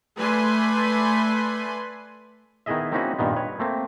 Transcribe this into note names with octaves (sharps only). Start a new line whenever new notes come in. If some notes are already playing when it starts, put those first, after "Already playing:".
A3 B4 D5 G#5 B5 C6
D#3 B3 E4 G#4 D#5 E5
A#3 C4 C#4 D#4 E4 F#4
G2 A#2 D#3 B3
B4 C#5
A3 A#3 C4